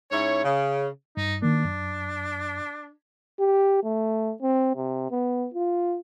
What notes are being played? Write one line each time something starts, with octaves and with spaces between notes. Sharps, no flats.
G#2 C#4 E4 C#5
C#3
G2 D#4
D#3 A#3 D4
F#2
G4
A3
C4
C3
B3
F4